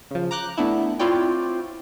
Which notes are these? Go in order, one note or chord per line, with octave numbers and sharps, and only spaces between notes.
C#3 F3
A#5 D6 F#6 G6
A3 B3 D4 E4
C4 E4 F4 C#5 D5 G5